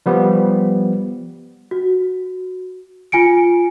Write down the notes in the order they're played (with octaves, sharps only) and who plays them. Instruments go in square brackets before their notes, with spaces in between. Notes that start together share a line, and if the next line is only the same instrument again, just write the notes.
[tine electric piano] F3 G3 B3
[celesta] F#4
F4 G#5 C#7 D7